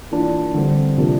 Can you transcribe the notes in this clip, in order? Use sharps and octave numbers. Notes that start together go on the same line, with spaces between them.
E3 A#3 D4 F4
D3 G3 C4
C3 F3 A#3 D4